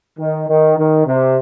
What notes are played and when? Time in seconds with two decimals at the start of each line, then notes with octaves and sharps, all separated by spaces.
0.19 D#3
0.48 D#3
0.77 D#3
1.06 C3